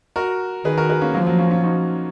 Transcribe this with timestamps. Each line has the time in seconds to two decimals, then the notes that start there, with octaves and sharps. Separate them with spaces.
0.16 F#4 A#4
0.64 D#3 G#4 B4
0.77 F#4 A#4
0.89 G#4 B4
1.01 A#3 C#4
1.14 F3 F#3 A#3
1.27 F#3 A#3
1.39 A#3 C#4
1.51 C#4 F4
1.63 D#4 F#4